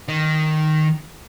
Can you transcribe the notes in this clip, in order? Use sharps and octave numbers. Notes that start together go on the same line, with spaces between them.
D#3